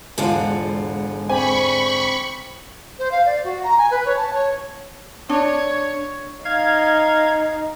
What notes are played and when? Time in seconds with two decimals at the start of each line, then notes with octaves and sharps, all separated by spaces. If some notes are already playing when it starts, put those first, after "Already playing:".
0.18 E1 G#2 D3 F4
1.30 C4 D5 G#5 B5 C#6
2.99 C5
3.12 F5
3.25 D5
3.44 F#4
3.64 A#5
3.78 G#5
3.91 B4
4.05 C#5
4.17 A5
4.33 C#5
5.29 D4 C#5
6.45 D#4 F5 G#6